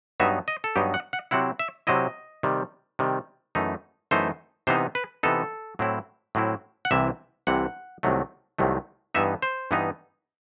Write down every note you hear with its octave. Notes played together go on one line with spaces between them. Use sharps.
G2 F#3 B3 D#4 E5
D#5
A4
G2 F#3 B3 D#4 G4
F#5
F#5
C3 F#3 C4 E4 F#5
E5
C3 F#3 C4 E4 D#5
C3 D#3 G3
C3 D#3 G3
F#2 E3 A3 D#4
F#2 E3 A3 D#4 C5
C3 E3 B3 D#4 C5
B4
C3 E3 B3 D#4 A4
A2 F#3 C4 E4
A2 F#3 C4 E4
F#5
C2 C3 E3 E5
C2 C3 E3 F#5
C2 C3 D#3 F#3 A3
C2 C3 D#3 F#3 A3
G2 E3 B3 D#4 E5
C5
G2 E3 B3 D#4